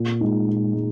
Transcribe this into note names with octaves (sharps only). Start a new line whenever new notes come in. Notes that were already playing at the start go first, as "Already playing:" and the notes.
Already playing: A#2
G#3 D#4
A#2
G#3